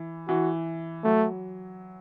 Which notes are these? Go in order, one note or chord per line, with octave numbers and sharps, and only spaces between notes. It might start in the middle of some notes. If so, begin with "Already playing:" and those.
Already playing: E3
E3 F#4
F#3 A3